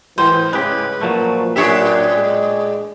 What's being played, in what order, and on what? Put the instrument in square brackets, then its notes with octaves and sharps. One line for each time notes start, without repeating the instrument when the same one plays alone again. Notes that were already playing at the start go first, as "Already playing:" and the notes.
[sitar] G#2 [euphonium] E3 [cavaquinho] C5
[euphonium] C#3 [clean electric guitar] G#3 G4 [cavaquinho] B4
[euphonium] A#2 [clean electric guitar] F3 F#3 A3
[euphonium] F#2 [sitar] A2 D4 G4 [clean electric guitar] C#5 E5
[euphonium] G#3